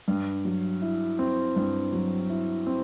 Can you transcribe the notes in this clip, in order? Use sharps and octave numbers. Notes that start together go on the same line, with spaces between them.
G2
F#3
E4
C4
G2
F#3
E4
C4